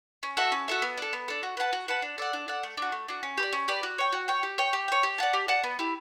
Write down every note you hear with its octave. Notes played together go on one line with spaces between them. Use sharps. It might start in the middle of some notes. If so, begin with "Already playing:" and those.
C#4
F#4 A4 E5
C#4
F#4 A4 E5
B3
D4 A4
B3
D4 A4
F#4
B4 F#5 A5
F#4
B4 F#5 A5
D4
A4 D5 F#5
D4
A4 D5 F#5
A3
D4 F#4
A3
D4 F#4
C#4
G4 B4
D5
C#4
G4 B4 D5
F#4
C#5 G5
F#4
C#5 G5
G4
C#5 G5
G4
C#5 G5
G4
D5 F#5 A5
G4
D5 F#5 A5
B3
E4 G4